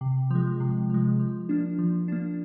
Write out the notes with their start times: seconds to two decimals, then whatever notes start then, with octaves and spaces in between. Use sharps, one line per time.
0.01 C3
0.31 F3 G#3
0.60 C3
0.90 F3 G#3
1.19 F3
1.49 A#3 D4
1.79 F3
2.08 A#3 D4